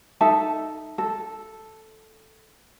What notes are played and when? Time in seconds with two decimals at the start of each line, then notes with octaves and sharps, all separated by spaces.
0.21 D#4 A4 E5 A5
0.98 A4